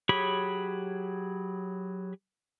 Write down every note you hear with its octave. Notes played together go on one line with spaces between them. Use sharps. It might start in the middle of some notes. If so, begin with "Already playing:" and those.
F#3 G4 G#4 C#5 B5